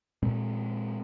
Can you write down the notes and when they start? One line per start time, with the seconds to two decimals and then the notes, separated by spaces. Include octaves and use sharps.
0.23 A#2 G#3 C4